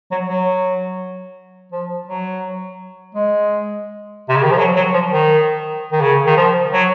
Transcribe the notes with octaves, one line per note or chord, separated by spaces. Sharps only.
F#3
F#3
F3
F#3
G#3
C3
C#3
D#3
F3
F#3
F#3
F3
D#3
D#3
C#3
D#3
F3
F#3